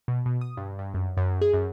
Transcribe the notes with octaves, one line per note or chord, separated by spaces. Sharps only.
B2
B2
D#6
G2
G2
F#2
F#2
G#4
F#2